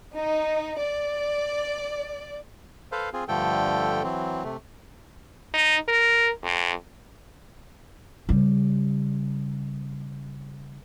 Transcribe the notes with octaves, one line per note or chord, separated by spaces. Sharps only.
D#4
D5
A4 B4 C5 F5
C4 F4 G#4
G2 D3 F3 A3 A4 G5
E3 F#3 C4
C3 A3
D#4
A#4
F2
C#3 G3